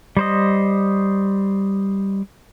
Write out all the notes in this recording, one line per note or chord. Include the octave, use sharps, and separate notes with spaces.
G3 C5 D#5